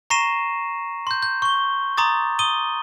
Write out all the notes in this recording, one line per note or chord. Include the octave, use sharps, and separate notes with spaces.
A#5 C#6 A#6 C7 D#7 E7
C6 G6
G6
C#6 G7
A#5 C6 D6 D#6 A6
D#6 D#7 G7